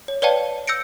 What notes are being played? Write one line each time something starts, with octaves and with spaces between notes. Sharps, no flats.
C#5
B4 C#5 D5 F5 G5 A5
E6 G6 A#6 C#7 D7